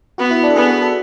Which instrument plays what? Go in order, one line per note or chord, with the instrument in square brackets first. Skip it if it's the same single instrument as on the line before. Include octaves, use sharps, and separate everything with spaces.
[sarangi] B3 [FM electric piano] F#4
[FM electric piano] E4
D4
A4
[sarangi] B3 [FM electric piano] G#4
[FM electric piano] F#4
A4